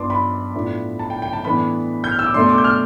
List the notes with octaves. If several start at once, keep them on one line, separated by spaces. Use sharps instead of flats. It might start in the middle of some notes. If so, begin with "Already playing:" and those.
Already playing: G2 F3 B3 D4 A5 C6 D6
B5
A2 F3 B3 D4
A5
G5
G5
A5
A2 E3 B3 D4 B5
G6
F6
E6
D6
B2 A3 D4 C6
D6
G6
F6